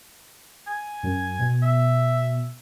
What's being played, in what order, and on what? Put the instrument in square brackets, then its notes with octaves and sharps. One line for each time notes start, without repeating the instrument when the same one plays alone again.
[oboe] G#5
[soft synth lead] F#2
B2
[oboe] E5